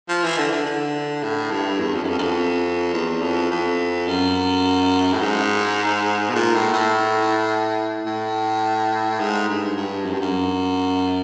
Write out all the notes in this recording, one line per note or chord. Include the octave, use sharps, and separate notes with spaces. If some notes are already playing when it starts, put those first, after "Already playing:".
F3
E3
D3
D3
D3
A2
G2
E2
F2
F#2
F2
F#2
F2
E2
F2
F2
F#2
A2
G#2
B2
A#2
A2
A2
A2
G#2
G2
G2
F#2
G2
F#2